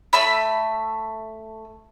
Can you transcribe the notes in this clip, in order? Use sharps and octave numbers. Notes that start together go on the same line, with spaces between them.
A3 E5 B5